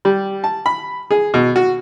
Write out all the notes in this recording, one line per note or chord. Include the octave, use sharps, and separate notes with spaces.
G3
A5
B5
G#4
B2
F#4